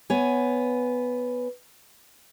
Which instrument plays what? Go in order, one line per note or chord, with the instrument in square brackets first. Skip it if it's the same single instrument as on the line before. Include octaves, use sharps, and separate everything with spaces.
[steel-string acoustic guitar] B3 C#5 G#5